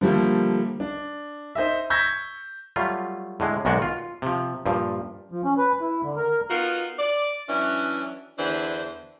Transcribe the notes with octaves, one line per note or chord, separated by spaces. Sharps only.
D3 F3 G3 A3 A#3
D4
D#4 C5 D#5 E5
C#6 E6 G6 G#6 A#6 B6
F#3 G3 A3 F4
A2 D3 G#3
B1 G#2 D#3 G#3 F#4 D5
F4
C3 F3
G2 A#2 F3
F3
C#4
B4
E4
D3
A#4
B3 D#4 F4 F#4 A#4
D5
E3 F#3 C#4 D4 E4
E2 D3 E3 D4 C5